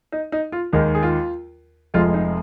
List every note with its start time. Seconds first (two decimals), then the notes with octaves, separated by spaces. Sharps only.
0.12 D#4
0.32 D#4
0.52 F4
0.73 D#2 D#3 G#3 D#4
0.95 G#4
1.03 F4
1.94 F1 F2 F3 G#3 F4
2.14 D#4